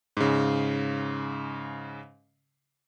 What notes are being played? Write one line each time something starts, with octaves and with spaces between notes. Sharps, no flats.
G#2 C#3